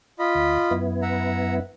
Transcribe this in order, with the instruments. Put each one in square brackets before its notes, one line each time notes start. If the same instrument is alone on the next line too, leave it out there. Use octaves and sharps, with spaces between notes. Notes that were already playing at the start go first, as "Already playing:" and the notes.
[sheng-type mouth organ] F4 D#5 B5
[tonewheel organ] D2
F#2 B3 E4
[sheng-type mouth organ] E5 F#5 A#5